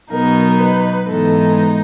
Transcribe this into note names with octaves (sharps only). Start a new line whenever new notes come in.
B2 F#3 B3 D#4 A#4
B4
G#2 E3 G#3 B3 D#4 A4